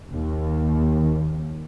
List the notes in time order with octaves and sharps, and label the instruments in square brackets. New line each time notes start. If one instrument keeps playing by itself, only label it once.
[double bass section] D#2 D#3